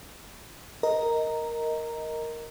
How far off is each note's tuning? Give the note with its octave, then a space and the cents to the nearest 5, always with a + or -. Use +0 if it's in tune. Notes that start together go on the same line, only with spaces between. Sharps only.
A#4 +0 D#5 +10 A#5 -5